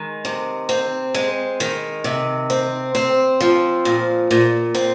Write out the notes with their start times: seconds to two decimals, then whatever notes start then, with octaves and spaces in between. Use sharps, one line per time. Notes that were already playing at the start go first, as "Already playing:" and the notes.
Already playing: D#3 G#3
0.25 C3
0.69 C4
1.15 G#3
1.60 D#3
2.04 C3
2.50 C4
2.95 C4
3.41 F3
3.85 A#2
4.31 A#2
4.75 C4